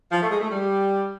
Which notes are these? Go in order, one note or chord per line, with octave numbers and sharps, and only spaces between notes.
F3
A3
G#3
A3
G3